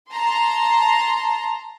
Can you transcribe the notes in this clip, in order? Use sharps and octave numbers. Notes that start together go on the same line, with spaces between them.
A5 A#5 C6